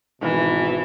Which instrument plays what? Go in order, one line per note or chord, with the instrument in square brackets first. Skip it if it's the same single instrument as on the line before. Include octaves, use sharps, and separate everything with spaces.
[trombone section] G#1 B2 [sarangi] E3